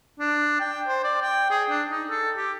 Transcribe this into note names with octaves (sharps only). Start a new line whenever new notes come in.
D4
G5
C5
D5
G5
G#4
D4
D#4
A4
G4